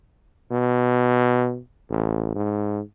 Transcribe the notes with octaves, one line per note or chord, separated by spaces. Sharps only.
B2
A1
G#2